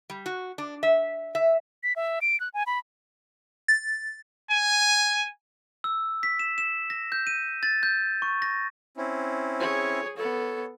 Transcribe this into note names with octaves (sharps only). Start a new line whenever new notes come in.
G3
F#4
D4
E5
E5
B6
E5
D7
F#6
G#5
B5
A6
G#5
E6
B6
E7
E7
A#6
G6
D#7
A6
G6
C#6
A#6
C4 C#4 E4
G#4 C#5
B3 A4 C#5